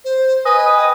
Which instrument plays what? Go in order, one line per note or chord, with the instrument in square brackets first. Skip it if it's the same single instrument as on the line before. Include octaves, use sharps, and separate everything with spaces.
[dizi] C5
[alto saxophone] B4 [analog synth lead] D#5 [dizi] G#5
[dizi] G5 [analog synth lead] D#6